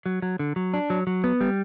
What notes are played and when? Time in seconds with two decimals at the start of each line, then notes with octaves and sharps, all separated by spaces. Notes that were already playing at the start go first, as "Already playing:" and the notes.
0.06 F#3
0.22 F#3
0.39 D3
0.56 F#3
0.74 D4
0.90 F#3
1.07 F#3
1.24 B3
1.41 G3